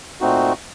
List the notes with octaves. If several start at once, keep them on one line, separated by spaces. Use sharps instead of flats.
A#2 A3 C4 D#4 F#4